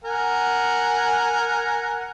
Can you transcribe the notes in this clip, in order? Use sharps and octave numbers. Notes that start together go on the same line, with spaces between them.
A#4 F#5 G#5